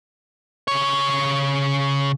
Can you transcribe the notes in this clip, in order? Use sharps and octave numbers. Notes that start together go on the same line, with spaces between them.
C#3 C#5